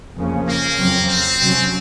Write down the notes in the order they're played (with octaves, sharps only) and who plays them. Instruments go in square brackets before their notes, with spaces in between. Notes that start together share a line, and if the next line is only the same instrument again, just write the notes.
[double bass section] F2 C#3 F3 A#3 C#4
[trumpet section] A#3
[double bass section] F2 C#3 F#3 C4
[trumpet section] C4
[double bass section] C3 F#3 C#4